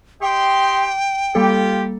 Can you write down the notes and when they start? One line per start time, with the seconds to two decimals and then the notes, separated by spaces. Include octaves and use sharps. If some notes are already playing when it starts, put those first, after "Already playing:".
0.22 G4 D#5 G5 C6
1.35 G3 A#3 F4 G4 A4